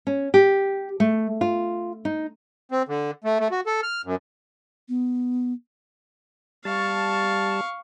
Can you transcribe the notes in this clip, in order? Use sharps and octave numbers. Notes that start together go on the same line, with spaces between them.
C#4
G4
A3
F4
D#4
C4
D3
A3
A3
F#4
A4
F6
F#2
B3
G3 F5 A5 C#6